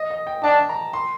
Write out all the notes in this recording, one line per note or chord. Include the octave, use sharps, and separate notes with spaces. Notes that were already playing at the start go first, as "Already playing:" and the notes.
Already playing: D#5
D#5
G5
D4 A5
A#5
C6